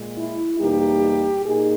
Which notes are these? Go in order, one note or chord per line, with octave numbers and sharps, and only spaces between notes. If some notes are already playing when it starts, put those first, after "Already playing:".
Already playing: A#2 G#3
E4
E2 B2 G3 A#3 D#4 G4
A#2 A#3 D#4 G#4